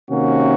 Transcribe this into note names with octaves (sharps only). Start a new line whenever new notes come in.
C3 D#3 A#3 C#4 F#4